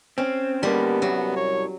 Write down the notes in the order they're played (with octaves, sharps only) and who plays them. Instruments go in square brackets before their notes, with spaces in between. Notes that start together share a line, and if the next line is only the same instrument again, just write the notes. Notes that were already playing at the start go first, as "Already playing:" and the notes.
[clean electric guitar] C4 [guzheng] C#4
[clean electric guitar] D3 A#3 [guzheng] G3 [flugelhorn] B3
[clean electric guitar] C2 [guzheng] F#3
[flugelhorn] C#5